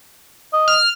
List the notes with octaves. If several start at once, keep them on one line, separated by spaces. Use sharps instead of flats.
D#5
F6